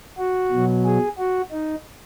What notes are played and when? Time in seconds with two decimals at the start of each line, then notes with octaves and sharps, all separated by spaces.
0.18 F#4
0.51 B2 F#3
0.85 G#4
1.18 F#4
1.52 D#4